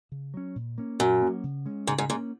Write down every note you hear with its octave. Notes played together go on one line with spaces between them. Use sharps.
C#3
F#3 C#4
A#2
A#3 C#4
F#2 A#2
F#3 A#3 C#4
C#3
G#3 C#4
G#2 C#3
G#2
G#2 A#3 C#4